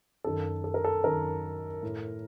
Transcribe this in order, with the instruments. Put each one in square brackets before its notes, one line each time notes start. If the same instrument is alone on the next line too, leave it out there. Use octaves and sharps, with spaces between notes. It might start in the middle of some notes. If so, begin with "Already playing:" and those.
[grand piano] F#2 D#3 A4
A4
A#4
A4
F#2 D#3 A#4
A2